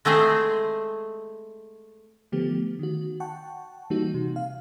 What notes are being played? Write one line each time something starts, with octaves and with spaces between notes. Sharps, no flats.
G#3 A3 C4 G#4 C5
D3 F3 A3 B3 G4
D#3 F#4
F#5 G5 A5 C#6
E3 G3 A#3 D#4 F#4
C3
F5